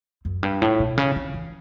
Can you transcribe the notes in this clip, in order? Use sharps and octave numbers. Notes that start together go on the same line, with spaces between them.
F#2
G2
A2
B2
C#3
D3
E3